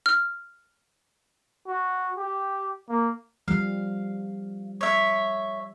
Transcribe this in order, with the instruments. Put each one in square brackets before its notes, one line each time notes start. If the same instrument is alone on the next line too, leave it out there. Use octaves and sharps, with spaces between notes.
[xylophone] F6
[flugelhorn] F#4
G4
A#3
[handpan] F3 G3 [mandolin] F5
[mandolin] C#5 E5